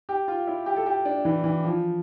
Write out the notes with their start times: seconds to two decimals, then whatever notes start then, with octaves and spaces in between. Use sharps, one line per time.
0.09 G4
0.28 F4
0.47 E4
0.66 G4
0.77 A4
0.86 G4
1.05 D4
1.25 E3
1.44 E3
1.64 F3